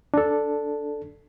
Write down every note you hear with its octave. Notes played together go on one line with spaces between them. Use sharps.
D4 A4